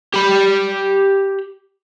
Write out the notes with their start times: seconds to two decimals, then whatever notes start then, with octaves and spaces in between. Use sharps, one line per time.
0.14 G4 B5